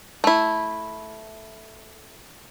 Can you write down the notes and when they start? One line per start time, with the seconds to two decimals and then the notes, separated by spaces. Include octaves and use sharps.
0.24 A3 E4